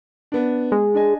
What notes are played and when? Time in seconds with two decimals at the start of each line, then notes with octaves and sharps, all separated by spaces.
0.32 B3 D4
0.72 G#3
0.94 D4 D#5 G#5